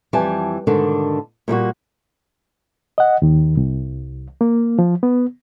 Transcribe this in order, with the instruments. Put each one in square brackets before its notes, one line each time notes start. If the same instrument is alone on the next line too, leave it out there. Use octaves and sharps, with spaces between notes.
[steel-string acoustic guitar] F2 E3 G3 G4 G#5 A5
G#2 B2 D3 D#3 D4
A#2 G3 A#3 F#4
[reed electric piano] D#5 F#5
D#2 D#3
C2
A#3
F3
B3